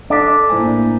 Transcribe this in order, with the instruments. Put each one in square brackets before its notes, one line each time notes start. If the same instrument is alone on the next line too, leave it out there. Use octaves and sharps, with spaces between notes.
[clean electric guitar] D4 [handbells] A4 B6
[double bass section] A2 A#3 [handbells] E4 C5 G#5